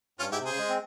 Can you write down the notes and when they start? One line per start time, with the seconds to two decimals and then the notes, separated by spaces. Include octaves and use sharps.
0.19 G2 C#4 F4
0.29 G#2 E4 G4
0.39 C3
0.45 C#3 G#4 C5
0.58 G#3
0.69 C4